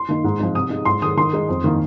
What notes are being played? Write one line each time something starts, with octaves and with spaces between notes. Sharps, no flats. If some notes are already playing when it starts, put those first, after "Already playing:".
Already playing: C6
D#3 A#3 D#4
G#2
F3 C4 D#4
C3 D#6
G#3 D#4
G#2 C6
D#3 G#3 D#6
D#3 C6
G#3 D#4
F2
D#3 A#3